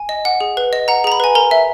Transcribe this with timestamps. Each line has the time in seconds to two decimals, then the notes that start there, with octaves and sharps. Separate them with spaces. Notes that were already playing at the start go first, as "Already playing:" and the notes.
Already playing: G#5
0.09 D#5
0.25 F#5
0.41 G#4
0.57 B4
0.73 D#5
0.88 F#5 A#5
1.04 G#4 A#5
1.12 B5
1.20 B4 G#5
1.35 A#4 A#5
1.51 E5